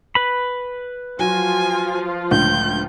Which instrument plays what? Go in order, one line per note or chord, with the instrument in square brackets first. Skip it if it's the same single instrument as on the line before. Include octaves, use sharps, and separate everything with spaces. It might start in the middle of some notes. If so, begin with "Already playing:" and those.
[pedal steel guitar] B4 B5
[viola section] F3 F4 [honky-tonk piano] F#3 F#4 [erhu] G#5
[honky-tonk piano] C#2 A2 D3 [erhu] G6